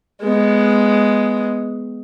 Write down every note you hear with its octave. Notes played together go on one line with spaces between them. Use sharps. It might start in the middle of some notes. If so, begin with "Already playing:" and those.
G#3 B3